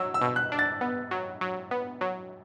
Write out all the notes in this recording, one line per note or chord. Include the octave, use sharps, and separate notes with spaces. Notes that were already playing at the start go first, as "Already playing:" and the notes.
Already playing: F#3 E6
E6
B2
F#6
D4
A6
B3
F#3
F#3
B3
F#3